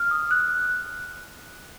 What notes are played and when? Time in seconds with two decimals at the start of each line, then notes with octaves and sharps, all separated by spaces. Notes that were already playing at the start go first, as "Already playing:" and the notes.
Already playing: F6
0.11 D#6
0.31 F#6